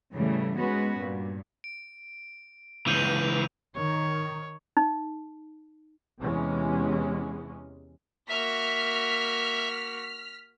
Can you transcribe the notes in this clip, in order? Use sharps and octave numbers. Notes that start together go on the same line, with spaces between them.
A2 C#3 E3 G3 A3
G#2 G#3 B3 C#4 F#4 B4
G2 A#2
D7
C#2 E3 G6 D#7 F7
D#3 C#5
D#4
E2 C3 E3 G#3 C#4
A#3 F#4 E5 F6 B6